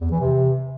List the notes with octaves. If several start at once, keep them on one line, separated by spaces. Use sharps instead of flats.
E2
E3
C3